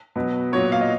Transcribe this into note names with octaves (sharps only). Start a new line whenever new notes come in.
B2 F#3 B3
A#2 F#3 B3 C#5
F5
D#5